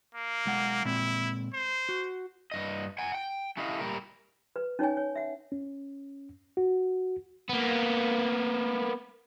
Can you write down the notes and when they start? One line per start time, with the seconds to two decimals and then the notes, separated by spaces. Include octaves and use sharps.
0.15 A#3
0.45 B1 G#3 F#5
0.85 A#2 G#3 C4 E4
1.54 C5
1.89 F#4
2.52 G2 D#5
2.98 F#5 G#5
3.15 G5
3.57 A3 C#4 E4 G4 D#5 F5
3.81 A#2 G3 A#4
4.56 B4
4.79 C#4 D#4 C#5 G5 G#5
4.97 C#5
5.15 E5 F#5
5.52 C#4
6.57 F#4
7.49 A#3 B3